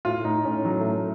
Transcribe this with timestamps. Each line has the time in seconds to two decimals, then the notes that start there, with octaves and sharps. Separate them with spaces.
0.05 A2 F4
0.25 A2 D#4
0.45 A2 C#4
0.65 A2 F#3
0.80 A3
0.86 A2
0.96 A3